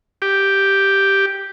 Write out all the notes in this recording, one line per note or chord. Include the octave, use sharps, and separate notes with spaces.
G4